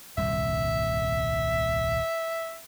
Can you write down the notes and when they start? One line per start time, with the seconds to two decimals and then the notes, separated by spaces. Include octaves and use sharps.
0.17 D#1 C2 G2 E5